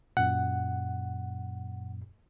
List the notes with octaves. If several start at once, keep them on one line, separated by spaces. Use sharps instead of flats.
F#2 A#2 F#5